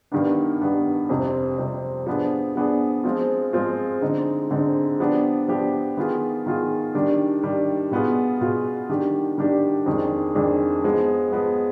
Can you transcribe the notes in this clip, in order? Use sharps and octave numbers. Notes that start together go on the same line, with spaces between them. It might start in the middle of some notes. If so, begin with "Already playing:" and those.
G2 D#3 B3 D4
G2 D#3 B3 D4
F2 C3 G3 C4
F2 C3 G3 C4
F3 B3 D4 G#4
F3 B3 D4 G#4
F3 G#3 C4 F4
F3 G#3 C4 F4
D3 G#3 C4 D#4
D3 G#3 C4 D#4
F3 B3 D4 G4
F3 B3 D4 G4
D#3 B3 F4 G#4
D#3 B3 F4 G#4
D#3 G3 D4
D#3 G3 D4
B2 B3 F4 G#4
B2 B3 F4 G#4
D#3 G3 D4 G4
D#3 G3 D4 G4
F2 D#3 G#3 D4
F2 D#3 G#3 D4
F3 G#3 B3
F3 G#3 B3